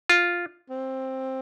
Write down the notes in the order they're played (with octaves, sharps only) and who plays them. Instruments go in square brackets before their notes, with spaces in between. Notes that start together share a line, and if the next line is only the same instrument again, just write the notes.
[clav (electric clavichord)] F4
[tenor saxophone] C4